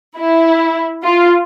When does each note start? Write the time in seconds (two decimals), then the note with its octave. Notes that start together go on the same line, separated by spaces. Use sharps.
0.16 E4
1.03 F4